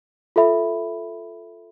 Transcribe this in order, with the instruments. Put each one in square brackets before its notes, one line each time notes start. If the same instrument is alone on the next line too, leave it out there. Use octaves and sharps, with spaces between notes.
[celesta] F4 A4 E5 B5